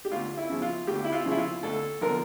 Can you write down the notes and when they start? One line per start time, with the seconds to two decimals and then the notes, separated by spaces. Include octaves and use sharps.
0.05 G4
0.12 D2 F4
0.37 E4
0.49 C#3 F3
0.62 F4
0.87 D2 G4
1.04 E4
1.12 F4
1.25 C#3 F3
1.31 E4
1.38 F4
1.63 D2 A4
2.01 D3 F3 A#4